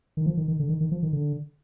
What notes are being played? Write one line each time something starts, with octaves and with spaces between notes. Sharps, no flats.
D#3
F3
D#3
D#3
D3
D#3
D#3
F3
D#3
D3